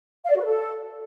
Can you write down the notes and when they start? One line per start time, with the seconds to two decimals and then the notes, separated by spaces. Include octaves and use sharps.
0.24 F5
0.30 D5
0.35 F#4
0.40 B4
0.45 A4